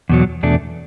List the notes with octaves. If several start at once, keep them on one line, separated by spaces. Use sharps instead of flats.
E2 B2 F#3
E2 B2 A3 D4